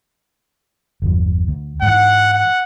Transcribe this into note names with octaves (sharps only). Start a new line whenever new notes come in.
G1 E2 F3
D2
G#2 E3 F#5
F#5